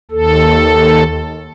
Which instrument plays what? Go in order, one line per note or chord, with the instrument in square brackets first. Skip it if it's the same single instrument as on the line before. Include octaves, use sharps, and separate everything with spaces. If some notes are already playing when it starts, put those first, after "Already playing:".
[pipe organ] D#2 A4